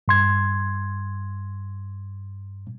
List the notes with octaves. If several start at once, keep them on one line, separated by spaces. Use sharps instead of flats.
G2 C6 G#6